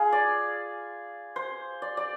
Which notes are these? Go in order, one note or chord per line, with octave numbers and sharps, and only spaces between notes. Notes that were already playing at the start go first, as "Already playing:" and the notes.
Already playing: F4 G#4
D5
C5
D5
D5